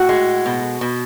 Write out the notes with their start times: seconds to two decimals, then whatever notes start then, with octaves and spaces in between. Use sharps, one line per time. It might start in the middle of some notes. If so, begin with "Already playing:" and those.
Already playing: A2 F#4
0.09 G#3
0.46 B2
0.81 B2